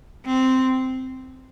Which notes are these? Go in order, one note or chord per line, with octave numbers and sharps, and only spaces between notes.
C4